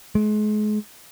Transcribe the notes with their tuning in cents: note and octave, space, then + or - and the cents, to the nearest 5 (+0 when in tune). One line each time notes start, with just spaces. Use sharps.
G#3 +35